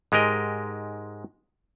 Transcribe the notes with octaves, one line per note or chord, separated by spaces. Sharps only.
G#2 G#3 G4 A#4 D#5